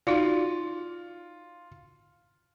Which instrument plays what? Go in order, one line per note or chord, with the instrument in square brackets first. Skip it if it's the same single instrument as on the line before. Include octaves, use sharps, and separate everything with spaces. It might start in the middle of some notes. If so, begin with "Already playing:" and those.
[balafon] D#4 F#4 D5 [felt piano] F4